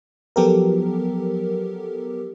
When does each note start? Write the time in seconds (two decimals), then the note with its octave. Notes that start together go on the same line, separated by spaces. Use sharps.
0.36 F3 F#3 B3 G4 A4 A#4